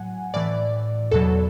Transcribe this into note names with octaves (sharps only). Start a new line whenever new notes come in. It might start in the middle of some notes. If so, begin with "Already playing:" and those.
Already playing: A2 F#3 F#5 G#5
A2 E3 D5
E2 B2 F#3 A4